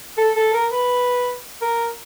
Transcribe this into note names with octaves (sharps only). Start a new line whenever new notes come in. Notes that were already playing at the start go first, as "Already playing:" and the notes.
A4
A4
A#4
B4
A#4